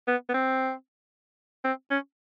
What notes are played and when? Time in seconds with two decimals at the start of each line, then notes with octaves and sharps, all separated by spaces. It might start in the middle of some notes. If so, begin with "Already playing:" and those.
0.08 B3
0.29 B3
0.34 C4
1.64 C4
1.90 C#4